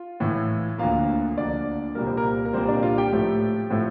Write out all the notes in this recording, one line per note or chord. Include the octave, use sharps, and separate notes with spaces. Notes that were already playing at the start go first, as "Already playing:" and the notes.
Already playing: F4
A2 E3 A3
D2 D3 F3 A#3 F4 F5
D2 D3 F3 A#3 D4 D5
C2 A#2 G3 A#3 A#4
C5
A#3 A#4
A#4
C2 A#2 G3 A#3 C4 C5
D4 D5
F4 F5
G4 G5
A2 F3 A3
A2 F3 A3